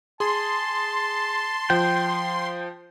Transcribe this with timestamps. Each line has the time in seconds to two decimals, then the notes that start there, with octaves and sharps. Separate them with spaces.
0.20 G#4 A5 C6
1.70 F3 G5